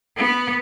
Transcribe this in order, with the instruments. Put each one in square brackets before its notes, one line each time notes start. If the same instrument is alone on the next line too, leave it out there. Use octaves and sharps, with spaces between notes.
[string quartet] B3